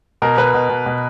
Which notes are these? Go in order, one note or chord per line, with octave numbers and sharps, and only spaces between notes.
B2 A#4
B2 B4
B2
B2
B2